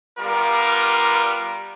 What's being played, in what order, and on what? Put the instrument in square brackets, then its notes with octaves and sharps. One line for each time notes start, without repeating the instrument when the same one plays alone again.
[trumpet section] G3 B3 F4 A#4 D6